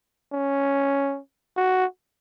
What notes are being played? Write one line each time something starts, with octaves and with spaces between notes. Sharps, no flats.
C#4
F#4